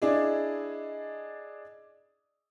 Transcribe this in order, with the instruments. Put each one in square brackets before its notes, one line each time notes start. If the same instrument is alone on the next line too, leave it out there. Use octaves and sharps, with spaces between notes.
[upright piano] D4 E4 G#4 D5 D#5